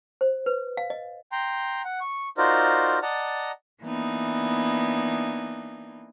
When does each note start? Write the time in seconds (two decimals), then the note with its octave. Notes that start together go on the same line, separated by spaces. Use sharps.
0.21 C5
0.46 B4
0.77 F5
0.90 D#5
1.32 G5 A#5 C6
1.84 F#5
2.01 C#6
2.38 D#4 F4 F#4 A#4 C5 D5
3.02 D5 D#5 F#5 A5 A#5
3.83 E3 A#3 B3 D4 D#4